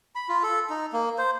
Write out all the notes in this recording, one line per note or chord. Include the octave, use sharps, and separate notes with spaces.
B5
F4
A4
D#4
A#3
C5